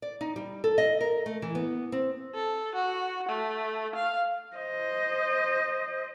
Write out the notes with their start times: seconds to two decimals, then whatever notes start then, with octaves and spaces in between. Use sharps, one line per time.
0.02 D5
0.21 D#4
0.36 G3
0.64 A4
0.78 D#5
1.01 A#4
1.26 A3
1.42 E3
1.55 B3
1.92 C4
2.34 A4
2.75 F#4
3.29 A3
3.95 F5
4.56 C5 D#5